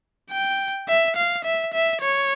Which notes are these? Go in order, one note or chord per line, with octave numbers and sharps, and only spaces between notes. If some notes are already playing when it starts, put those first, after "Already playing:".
G5
E5
F5
E5
E5
C#5